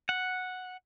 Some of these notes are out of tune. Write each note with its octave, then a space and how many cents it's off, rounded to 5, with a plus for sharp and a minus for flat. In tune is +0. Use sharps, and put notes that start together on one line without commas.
F#5 -5